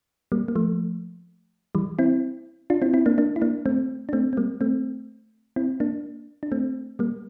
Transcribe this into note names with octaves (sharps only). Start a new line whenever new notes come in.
G3 A#3
A#3
F3 A3
E3 G3
C4 E4
D4 F4
C4 E4
C4 E4
A#3 D4
A#3 D4
E4
A#3 D4
A3 C4
D4
A3 C4
C4
G3 A#3
A3 C4
C4 E4
A#3 D4
D4
A3 C4
G3 A#3